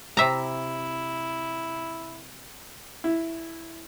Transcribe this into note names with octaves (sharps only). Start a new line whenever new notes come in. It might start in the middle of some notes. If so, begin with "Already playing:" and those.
C3 E4 E5 A#5
E4